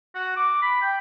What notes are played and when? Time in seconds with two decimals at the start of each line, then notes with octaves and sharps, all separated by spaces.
0.15 F#4
0.36 D6
0.62 B5
0.82 G5